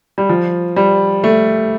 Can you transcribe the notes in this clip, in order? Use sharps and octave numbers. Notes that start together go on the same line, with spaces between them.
G3
F3
G3
A3